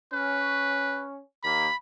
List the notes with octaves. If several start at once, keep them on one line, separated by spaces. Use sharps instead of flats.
C#4 B4
D#2 A#3 B5